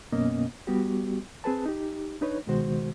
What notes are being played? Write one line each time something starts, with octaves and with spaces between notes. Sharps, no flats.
F#2 B2 A#3 B3 C#4 D#5
G3 B3 F#4 G4
C4 G#4 B4 A5
D#4 G4
D4 D#4 B4 C#5
C#2 B2 D#3 G#3 F#4 C5